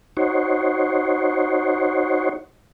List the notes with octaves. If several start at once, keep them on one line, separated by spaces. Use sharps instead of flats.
D#4 F#4 C5 C#5